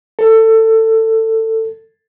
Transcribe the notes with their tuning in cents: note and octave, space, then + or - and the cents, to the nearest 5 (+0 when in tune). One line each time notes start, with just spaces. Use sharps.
A4 +20